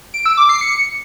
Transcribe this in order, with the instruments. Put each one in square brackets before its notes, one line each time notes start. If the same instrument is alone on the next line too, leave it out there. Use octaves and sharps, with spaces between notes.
[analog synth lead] D7
E6
D6
C7
C#7